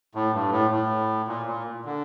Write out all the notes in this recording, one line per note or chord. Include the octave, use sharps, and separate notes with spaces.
A2
G2
A2
A2
A#2
A#2
D3